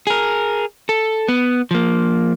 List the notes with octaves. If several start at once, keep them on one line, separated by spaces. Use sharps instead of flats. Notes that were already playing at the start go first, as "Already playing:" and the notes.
G#4 A#4
A4
B3
F3 A#3